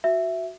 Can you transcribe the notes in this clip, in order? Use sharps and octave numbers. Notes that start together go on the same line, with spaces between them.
F#4 E5